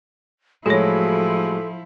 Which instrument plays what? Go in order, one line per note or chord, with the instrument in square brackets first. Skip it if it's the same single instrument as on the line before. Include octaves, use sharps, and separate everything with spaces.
[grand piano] A2 F#3 G#3 [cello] F3 E4 [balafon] F#4 C#5 [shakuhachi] A4